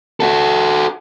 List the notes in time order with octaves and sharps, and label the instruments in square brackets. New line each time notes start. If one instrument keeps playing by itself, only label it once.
[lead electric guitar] F#4 A4